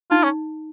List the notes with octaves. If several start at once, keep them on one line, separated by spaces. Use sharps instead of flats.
D#4 F4
C#4